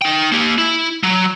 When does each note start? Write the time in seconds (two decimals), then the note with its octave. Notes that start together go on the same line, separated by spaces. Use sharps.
0.02 D#4 G5
0.32 A#3 G4
0.58 E4
1.03 F#3